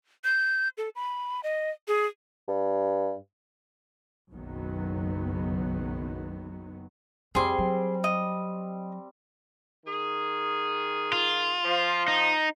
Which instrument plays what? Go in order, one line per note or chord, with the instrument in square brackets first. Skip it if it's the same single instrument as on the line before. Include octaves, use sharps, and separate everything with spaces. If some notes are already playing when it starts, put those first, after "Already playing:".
[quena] G6
A4
B5
D#5
G#4
[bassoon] G2
[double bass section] F#1 B1 F#2 D#3 F#3 B3
[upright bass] F2 [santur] G3 C4 [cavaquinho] G#4 C6
[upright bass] F#3
[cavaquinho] D#5
[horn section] D#3 G#4
[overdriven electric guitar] F4
[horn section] F3
[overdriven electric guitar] D#4